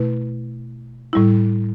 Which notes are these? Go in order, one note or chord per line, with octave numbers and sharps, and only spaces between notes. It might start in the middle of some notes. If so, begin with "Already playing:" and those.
Already playing: B2 A3 E4 B4
A2 G3 E4